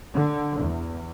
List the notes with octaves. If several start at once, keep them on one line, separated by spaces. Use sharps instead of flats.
D3
E2